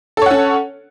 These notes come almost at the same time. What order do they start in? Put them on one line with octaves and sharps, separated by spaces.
A4 C#5 F#5 C#4